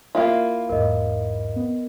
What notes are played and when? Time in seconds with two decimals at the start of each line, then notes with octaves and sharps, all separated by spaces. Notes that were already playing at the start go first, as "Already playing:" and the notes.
0.15 A#3 E4 F4
0.69 B1 E2 G#2 A#4 D#5
1.56 B3